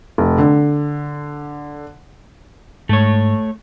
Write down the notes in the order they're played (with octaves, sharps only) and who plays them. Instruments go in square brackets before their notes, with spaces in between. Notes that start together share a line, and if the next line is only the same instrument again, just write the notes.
[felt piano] F1
D3
[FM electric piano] G#2 [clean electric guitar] A3 C#5